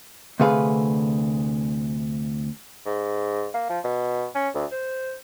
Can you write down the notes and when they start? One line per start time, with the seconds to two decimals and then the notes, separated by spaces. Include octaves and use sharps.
0.40 D2 C3 A3 G#4 B4 F5
2.86 G#2
3.54 A#3
3.70 F3
3.84 B2
4.35 C#4
4.54 D2
4.72 C5